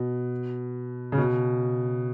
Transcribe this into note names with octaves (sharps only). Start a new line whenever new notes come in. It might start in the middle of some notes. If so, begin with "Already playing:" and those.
Already playing: B2
C#3
B2